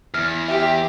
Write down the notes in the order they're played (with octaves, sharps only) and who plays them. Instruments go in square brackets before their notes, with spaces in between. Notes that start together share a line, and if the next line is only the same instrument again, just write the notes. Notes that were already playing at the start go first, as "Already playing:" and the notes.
[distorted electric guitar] E2 [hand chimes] F6
[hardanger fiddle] G4 [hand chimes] E5